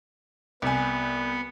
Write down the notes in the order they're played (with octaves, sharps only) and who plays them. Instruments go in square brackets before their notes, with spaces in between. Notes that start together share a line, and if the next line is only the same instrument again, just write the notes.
[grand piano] C2 G#5 [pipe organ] B3